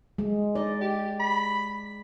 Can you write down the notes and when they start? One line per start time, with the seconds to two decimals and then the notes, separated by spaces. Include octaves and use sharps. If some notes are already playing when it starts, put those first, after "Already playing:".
0.18 G#3
0.55 D#4 D5
0.81 G4
1.20 B5